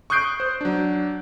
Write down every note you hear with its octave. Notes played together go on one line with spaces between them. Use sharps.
C#6 D#6 F#6 G6 C7 D7
C5
F#3 D4